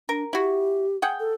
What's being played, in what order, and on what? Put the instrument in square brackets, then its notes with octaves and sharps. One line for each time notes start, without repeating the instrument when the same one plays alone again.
[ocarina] D4 [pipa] A#4
[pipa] E4 F#4 [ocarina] G4
[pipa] G#4 F#5 G5
[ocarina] A4